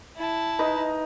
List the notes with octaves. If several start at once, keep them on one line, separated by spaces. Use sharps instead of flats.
E4 A5
D#4 B4 D#5